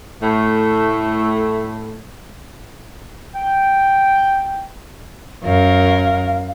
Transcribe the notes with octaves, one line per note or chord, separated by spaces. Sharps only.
A2 A3
G5
F#2 A#4 F5